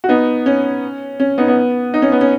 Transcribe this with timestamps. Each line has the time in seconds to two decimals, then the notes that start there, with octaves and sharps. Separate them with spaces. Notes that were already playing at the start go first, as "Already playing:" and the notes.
0.04 F#4
0.09 B3 D#4
0.46 C#4
1.20 C#4
1.38 B3 D#4
1.48 B3
1.94 D#4
2.02 C#4
2.12 B3
2.21 C#4